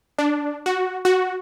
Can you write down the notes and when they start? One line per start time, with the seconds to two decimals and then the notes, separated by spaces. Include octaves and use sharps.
0.19 D4
0.66 F#4
1.05 F#4